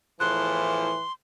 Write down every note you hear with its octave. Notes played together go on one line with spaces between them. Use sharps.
E2 A2 E3 F3 C6 F#6